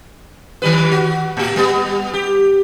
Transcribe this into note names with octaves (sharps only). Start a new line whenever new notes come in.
D#3 G3 B4
F#4
A2 G4
G3 B3
G4